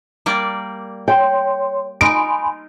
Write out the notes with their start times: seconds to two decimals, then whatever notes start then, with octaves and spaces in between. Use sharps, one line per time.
0.26 G3 A#3 D5
1.08 C#5 G5 C6
2.01 D#4 G#5 B5 C6 D7